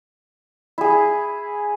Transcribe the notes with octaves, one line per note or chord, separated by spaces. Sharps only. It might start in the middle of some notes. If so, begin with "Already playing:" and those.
E4 G#4